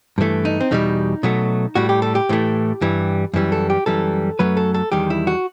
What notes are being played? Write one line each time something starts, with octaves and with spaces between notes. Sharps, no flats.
G2 E3 A3
D#4
C4
E2 B2 G3 D#4
B2 F#3 A3
A2 G3 F#4
G4
A4
G4
A2 E3 A3
G2 E3 G3
F#2 E3 G3
A4
G4
F#2 E3 G3 A4
F#2 F#3 A3 B4
A4
A4
E2 D#3 G3 G4
E4
F#4